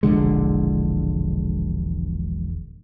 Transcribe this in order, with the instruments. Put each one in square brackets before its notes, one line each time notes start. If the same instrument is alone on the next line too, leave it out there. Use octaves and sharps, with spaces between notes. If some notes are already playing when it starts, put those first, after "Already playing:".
[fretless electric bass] E1 A#1 D3 G#3